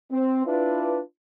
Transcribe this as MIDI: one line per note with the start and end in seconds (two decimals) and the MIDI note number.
0.11 0.44 60
0.46 1.00 62
0.46 1.00 64
0.46 1.00 65
0.46 1.00 71